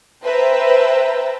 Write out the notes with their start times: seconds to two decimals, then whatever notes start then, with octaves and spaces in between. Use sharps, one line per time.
0.23 B4 C5 E5 G5 A5 A#5